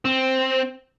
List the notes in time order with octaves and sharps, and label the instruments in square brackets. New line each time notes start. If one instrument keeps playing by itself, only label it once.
[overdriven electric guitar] C4